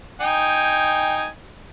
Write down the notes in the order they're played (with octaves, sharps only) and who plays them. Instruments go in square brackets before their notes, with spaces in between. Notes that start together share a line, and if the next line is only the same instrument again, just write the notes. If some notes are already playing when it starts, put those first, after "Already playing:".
[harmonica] D#4 G5 G#5